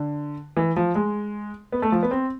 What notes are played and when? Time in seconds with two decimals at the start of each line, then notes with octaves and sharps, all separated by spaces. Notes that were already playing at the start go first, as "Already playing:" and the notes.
Already playing: D3
0.57 E3
0.76 F3
0.95 G#3
1.72 B3
1.82 A3
1.92 F3
2.03 B3
2.11 C4